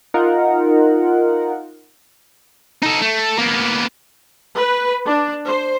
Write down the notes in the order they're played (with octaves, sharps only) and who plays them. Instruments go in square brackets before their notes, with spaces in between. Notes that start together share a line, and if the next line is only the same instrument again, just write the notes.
[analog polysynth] D#4 F4 A#4 F#5
[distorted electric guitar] D#4 A4
A3
A#3 B3
[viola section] B4
D4
C5